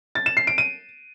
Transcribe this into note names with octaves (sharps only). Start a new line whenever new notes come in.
A6
E7
C7
D7
D#7